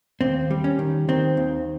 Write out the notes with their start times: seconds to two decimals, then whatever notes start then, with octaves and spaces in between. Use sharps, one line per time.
0.21 D#2 C4
0.51 G3
0.64 C#4
0.79 D#3
1.08 D#3 C4
1.37 D#2